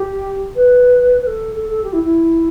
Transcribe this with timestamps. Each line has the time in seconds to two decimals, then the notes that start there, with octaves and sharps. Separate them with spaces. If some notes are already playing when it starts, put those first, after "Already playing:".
Already playing: G4
0.56 B4
1.21 B4
1.27 A4
1.56 A4
1.70 A4
1.84 G4
1.93 E4
2.03 E4